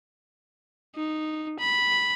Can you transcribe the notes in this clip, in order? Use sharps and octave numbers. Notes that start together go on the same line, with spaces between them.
D#4
B5